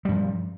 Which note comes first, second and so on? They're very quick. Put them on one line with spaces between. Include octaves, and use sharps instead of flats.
G3 G2 F3